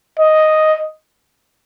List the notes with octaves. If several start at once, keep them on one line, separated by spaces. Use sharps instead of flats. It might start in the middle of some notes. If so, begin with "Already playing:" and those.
D#5